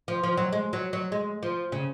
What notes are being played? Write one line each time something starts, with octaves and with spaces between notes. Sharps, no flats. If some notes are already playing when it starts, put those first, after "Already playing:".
F3
F3
F#3
G#3
F#3
F#3
G#3
F3
C#3